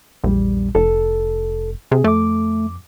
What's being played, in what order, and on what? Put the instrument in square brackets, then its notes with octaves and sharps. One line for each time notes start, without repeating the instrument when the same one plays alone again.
[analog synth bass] A#1 [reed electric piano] E2 G3
[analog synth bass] F1 [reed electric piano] A4
[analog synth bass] C3 [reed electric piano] G#4
[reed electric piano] F2 D6 [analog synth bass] A3